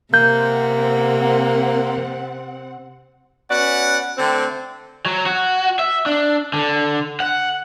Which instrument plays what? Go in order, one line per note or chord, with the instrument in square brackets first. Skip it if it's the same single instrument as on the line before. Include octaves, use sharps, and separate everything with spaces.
[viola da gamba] C3 [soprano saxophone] A#3 [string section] C4 F#5 [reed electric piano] G6
[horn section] B3 C#4 F#4 D5 F#5
D3 A3 C4
[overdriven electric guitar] F#3
F#4
E5
D4
D3
F#5